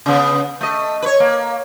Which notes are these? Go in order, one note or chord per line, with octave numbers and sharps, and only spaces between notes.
C#3 B3
A3 D#5
B4 C#5
A#3